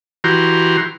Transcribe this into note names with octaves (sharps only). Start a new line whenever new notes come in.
E3 F#4 G4 A#5 C6